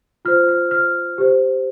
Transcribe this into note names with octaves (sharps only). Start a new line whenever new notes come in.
F4 C5 F6
F6
F6
G4 C5